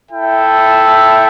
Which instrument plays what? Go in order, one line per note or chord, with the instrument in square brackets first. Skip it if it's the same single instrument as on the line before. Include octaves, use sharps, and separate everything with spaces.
[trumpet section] E4 A4 E5 G5